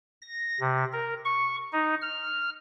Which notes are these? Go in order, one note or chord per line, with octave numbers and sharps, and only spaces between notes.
A#6
C3
A#4
C#6
D#4
F6